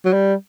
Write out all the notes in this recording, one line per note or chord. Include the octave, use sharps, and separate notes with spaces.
F#3
G3